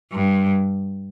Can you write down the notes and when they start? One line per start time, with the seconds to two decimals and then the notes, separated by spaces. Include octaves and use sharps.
0.12 G2